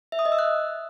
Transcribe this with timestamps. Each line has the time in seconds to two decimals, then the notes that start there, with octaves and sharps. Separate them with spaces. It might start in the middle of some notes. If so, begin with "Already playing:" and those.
0.12 E5
0.19 D#6
0.25 D#5
0.32 E6
0.39 F#6